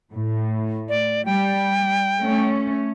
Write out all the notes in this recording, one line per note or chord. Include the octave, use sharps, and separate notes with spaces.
A2
D5
G3 G5
A3 C#4